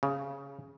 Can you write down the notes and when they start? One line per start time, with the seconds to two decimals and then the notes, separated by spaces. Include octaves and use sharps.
0.03 C#3